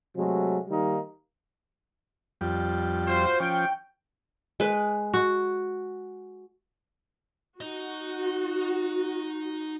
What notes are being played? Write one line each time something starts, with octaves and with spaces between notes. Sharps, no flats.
C3 F#3 G#3 A3
D#3 G3 A#3 D#4
F2 G3
F4 F#4 C5
F3 C#4 G5
G#3 B4
F#4
D#4 F#4 D#5